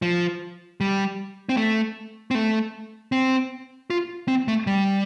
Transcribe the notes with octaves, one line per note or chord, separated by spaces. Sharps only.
F3
G3
C4
A3
C4
A3
C4
F4
C4
A3
G3